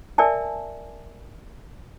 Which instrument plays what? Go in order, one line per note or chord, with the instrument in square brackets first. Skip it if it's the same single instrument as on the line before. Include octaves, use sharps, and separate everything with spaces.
[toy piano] A#4 D5 E5 G#5 A5